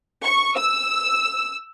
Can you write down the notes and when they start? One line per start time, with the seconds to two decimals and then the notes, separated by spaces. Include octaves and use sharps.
0.25 C#6
0.57 E6